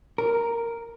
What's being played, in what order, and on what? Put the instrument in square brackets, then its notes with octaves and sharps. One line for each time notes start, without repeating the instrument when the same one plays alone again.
[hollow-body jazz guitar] A#4